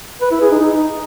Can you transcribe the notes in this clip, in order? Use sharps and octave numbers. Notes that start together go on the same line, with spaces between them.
B4
E4
G#4
D#4